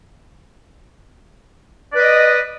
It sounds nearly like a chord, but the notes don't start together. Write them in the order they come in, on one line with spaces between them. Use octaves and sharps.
D5 B4 D#5